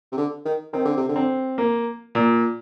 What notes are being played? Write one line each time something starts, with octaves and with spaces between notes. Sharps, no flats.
C3
D3
D#3
D#3 C4
D3
C3
D3
C4
A#3
A#2